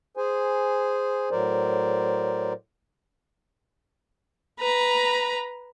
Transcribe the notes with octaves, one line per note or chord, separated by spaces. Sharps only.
G#4 C5 G#5
A2 F#3 A#4 C5 D5
B4 A#5